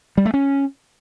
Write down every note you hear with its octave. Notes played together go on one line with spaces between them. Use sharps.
G3
A3
C#4